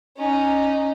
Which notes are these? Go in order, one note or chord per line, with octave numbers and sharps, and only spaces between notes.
C#4 D#4